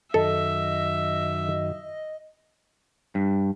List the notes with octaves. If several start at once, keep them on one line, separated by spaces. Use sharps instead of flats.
F#2 D#3 A4 D#5 E5
G2